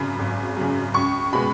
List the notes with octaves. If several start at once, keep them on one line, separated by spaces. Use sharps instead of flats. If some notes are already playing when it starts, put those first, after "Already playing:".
Already playing: G#1 F#2 C#3 B5
G#1
F#2 C#3
C#2 C#6
B2 G#3 B3 B5